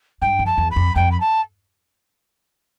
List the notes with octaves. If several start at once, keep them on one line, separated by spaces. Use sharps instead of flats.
G2 G5
F2
A5
E2
B5
F2
F2 G5
B5
A5